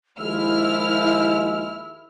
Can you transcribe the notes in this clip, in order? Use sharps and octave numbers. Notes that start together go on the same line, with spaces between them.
D#2 F3 G#3 E4 E6 F6